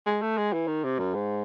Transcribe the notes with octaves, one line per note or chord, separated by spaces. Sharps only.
G#3
A3
G#3
E3
D#3
C3
F#2
G#2